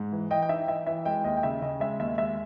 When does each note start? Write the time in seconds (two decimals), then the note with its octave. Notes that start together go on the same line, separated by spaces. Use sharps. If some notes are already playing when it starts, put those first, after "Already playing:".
Already playing: G#2
0.12 E3
0.31 E3 D#5 G5
0.42 G5
0.49 D#4 E5
0.68 E3 E5
0.87 E3 E5
1.05 G#3 D#5 G5
1.24 D#2 D#5 G5
1.37 G5
1.43 C#3 E5
1.62 C#3 D#5
1.80 G#3 E5
1.99 D#2 E5
2.18 G#3 E5